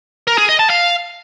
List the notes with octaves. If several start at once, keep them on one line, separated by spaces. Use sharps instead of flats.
A#4
G#4
D#5
A5
F5